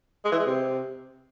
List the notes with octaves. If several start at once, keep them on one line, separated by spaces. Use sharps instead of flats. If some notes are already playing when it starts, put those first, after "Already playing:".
G#3
E3
G#3
C3